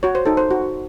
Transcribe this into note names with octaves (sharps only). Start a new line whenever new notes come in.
F#4 C#5
C5
D#4 A4
C5
F#4